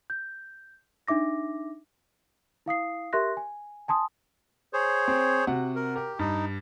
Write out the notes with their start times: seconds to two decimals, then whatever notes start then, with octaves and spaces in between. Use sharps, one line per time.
0.10 G6
1.08 D4 D#4 E5 D6 A#6
2.66 E4 F5 D#6 C7
3.13 G4 A#4 E5 C6 F#6 A#6
3.37 G#5
3.88 G#5 A5 C6 D#6
4.73 G#4 C5 C#5
5.08 C4
5.47 C3 F#4 F#5
5.75 A#4
5.96 G4 A#4
6.19 G2 D#4